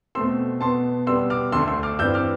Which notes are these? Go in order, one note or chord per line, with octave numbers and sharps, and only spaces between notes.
B2 A3 C4 C6 E6
B2 B3 A5 C6
B2 G3 B3 C6 E6
D6 F6
D2 D3 A3 C6 E6
C6 E6
D6 F6
G2 E3 G3 C4 E6 G6
D6 F6